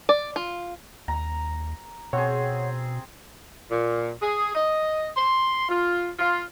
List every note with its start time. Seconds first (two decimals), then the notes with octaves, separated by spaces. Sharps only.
0.09 D5
0.36 F4
1.08 D#2 A#5
2.13 B2 C4 G#4 C#5 F#5
3.70 A#2
4.22 G#4
4.55 D#5
5.17 C6
5.69 F4
6.19 F4